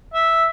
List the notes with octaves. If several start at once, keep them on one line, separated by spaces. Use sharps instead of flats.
E5